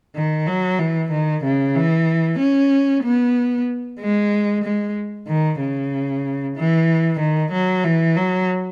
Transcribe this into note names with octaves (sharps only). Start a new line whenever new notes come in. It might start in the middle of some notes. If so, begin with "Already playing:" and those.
D#3
F#3
E3
D#3
C#3
E3
C#4
B3
G#3
G#3
D#3
C#3
E3
D#3
F#3
E3
F#3